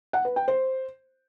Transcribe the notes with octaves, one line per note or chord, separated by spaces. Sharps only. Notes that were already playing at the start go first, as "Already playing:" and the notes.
F#5
B4
G5
C5